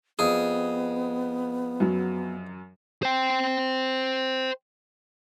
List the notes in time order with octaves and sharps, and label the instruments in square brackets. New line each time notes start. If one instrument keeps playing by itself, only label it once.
[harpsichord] F2 G#4 [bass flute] B3 [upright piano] D#6
[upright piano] F#2 F#3
[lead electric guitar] C5 G5